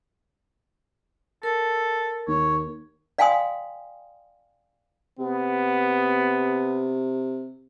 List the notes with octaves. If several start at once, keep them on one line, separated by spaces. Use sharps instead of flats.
A4 A#4
D#2 C#5
D5 F5 G5 G#5 C6 D#6
C3 B3